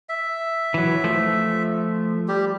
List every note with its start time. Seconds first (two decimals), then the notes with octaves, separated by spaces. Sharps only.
0.09 E5
0.74 E3 F#3
1.04 F3 A3
2.28 G3 G4